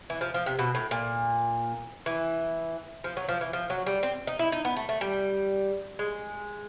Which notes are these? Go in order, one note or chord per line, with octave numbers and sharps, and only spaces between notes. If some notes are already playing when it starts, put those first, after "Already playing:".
E3
F3
F3
C3
B2
A2
A#2
E3
F3
F#3
F3
E3
F3
F#3
G3
C4
D#4
E4
D#4
B3
A3
A3
G3
G#3